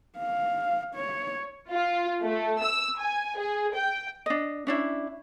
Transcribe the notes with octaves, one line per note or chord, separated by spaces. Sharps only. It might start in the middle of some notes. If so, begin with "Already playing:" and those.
F5
C#5
F4
A3
E6
G#5
G#4
G5
D4 D#5
C#4 D4 E4